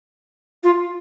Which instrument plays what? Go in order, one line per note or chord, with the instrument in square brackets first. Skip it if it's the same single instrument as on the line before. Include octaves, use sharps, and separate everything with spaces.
[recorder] F4